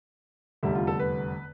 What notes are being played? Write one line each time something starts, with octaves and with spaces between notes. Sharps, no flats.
F1 E2 D3 G3 E5
F4
A4
B4